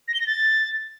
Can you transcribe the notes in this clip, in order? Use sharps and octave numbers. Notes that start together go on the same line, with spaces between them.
A#6
G7
A#6
A6